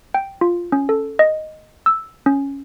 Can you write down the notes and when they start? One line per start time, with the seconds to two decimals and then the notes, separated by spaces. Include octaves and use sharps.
0.14 G5
0.41 F4
0.72 C#4
0.89 A4
1.19 D#5
1.86 E6
2.26 C#4